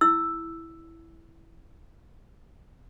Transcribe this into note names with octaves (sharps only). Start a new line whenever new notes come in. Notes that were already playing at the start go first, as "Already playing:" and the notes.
E4 E6